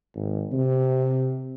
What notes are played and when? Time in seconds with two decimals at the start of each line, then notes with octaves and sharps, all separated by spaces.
0.16 G#1
0.52 C3